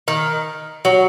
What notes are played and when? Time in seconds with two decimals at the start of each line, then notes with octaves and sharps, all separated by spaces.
0.08 D#3
0.85 F#3